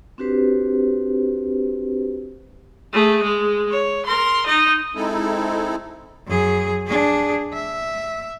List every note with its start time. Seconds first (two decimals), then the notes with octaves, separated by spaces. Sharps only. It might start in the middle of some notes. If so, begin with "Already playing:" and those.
0.18 C4 D4 F#4 G4 B4 C5
2.93 A3 G#4
3.23 G#3
3.71 C#5
4.06 A#4 C6
4.46 D#4 D#5
4.95 G#3 C4 D#4 E4 A4
6.27 F#2 G#4
6.87 D4 G#4
7.53 E5